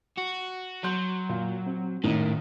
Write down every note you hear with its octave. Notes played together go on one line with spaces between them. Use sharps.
F#4
F#3 C6 G6
A#2
C4
G#1 A2 D#3 C#4